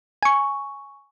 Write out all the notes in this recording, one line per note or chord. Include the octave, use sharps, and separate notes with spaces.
G#5 C#6